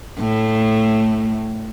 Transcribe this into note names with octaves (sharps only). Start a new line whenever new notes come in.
A2 A3